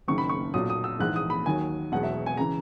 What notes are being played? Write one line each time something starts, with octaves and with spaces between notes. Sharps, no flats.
F#1 F#2 D#3 C#6
B5
C#6
B1 A#2 F#3 D#6
D#6
E6
A#1 G#2 E3 F#6
D#6
B5
D#2 D#3 F#3 G#5
E1 E2 B2 F#3 F#5
E5
G#5
C#3 E3 A#5